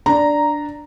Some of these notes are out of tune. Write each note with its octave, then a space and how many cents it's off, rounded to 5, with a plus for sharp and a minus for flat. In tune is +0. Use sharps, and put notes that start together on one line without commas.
D4 +0 A#5 +0